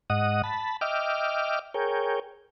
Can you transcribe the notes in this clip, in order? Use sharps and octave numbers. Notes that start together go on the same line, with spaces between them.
G#2 D#5 F#5 D#6
A5 B5
D#5 E5 G5 D6 F6
G#4 A#4 C#5 G5